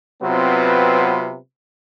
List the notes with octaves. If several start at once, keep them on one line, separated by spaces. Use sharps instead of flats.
C3 F#3 B3 C4 F4 B4